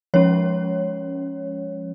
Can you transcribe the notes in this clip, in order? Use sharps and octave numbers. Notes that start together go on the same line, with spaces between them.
F3 G#3 C#4 C#5